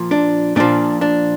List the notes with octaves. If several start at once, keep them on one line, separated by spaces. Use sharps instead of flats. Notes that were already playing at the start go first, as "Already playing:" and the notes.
Already playing: A#2 F3
D4
A#2 F3 D4
D4